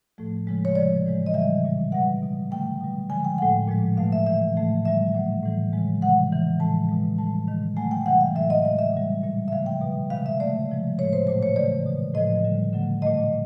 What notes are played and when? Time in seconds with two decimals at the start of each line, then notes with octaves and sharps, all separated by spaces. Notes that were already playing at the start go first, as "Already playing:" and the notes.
0.18 A2 F3 A3
0.47 C#3 F3 G#3
0.65 C#5
0.75 C3 F3 G#3 D5
1.06 A2 E3 G#3
1.26 D#5
1.34 C#3 E3 G3 E5
1.64 A#2 G3
1.92 B2 G3 F#5
2.23 B2 G3
2.51 D3 F#3 A3 G5
2.81 B2 G3
3.10 D3 F3 G#3 G#5
3.25 G5
3.38 A2 F3 A3 F#5
3.67 A#2 F3 G#3
3.97 B2 F#3 A3 F5
4.12 E5
4.26 C#3 E3 A3 E5
4.55 A2 F3 A3
4.85 D3 G3 E5
5.14 A#2 F#3 A3
5.43 A2 E3 G3
5.73 C#3 F3 G#3
6.02 C3 E3 G#3 F#5
6.32 C#3 E3 G#3
6.60 A2 F3 G#3 A5
6.89 B2 G#3
7.18 A2 E3 G3 A5
7.47 C3 D#3 G#3
7.77 C#3 F#3 A3 G#5
7.91 G5
8.06 C3 E3 G3 F#5
8.21 F5
8.35 A2 F#3 A3 E5
8.50 D#5
8.65 C#3 E3 G#3 D#5
8.79 E5
8.93 B2 G3
9.23 A#2 G3
9.48 E5
9.52 C#3 F3 A3 F5
9.66 G5
9.81 B2 G3
10.10 C3 D#3 G#3 F5
10.26 E5
10.40 C#3 F#3 A3 D5
10.69 C3 F3 G#3
10.99 A2 F3 A3 C#5
11.13 C5
11.27 A#2 F#3 A3 C5
11.43 C#5
11.56 C#3 E3 A3 D5
11.86 B2 G#3
12.14 A2 F3 A3 D#5
12.44 D3 G3
12.73 D3 F#3 A3
13.02 A#2 F#3 A3 D#5